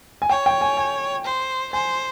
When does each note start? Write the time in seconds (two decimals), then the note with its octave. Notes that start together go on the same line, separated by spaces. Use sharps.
0.22 G#5
0.30 C#5 G5
0.46 G5
0.61 G#5
0.77 G#5
1.25 C5
1.73 C5 G#5